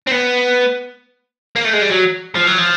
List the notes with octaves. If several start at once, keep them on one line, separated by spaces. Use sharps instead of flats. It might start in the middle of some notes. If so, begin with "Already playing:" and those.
C4
B3
A#3
A3
G#3
G3
F#3
F3
F#3
F3